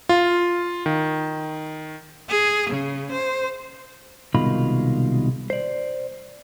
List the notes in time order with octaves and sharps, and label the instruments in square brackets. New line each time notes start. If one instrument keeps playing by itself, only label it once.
[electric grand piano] F4
D#3
[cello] G#4
C#3
C5
[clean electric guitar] C2 B2 D#3 G#3 F4 B5
C5 D5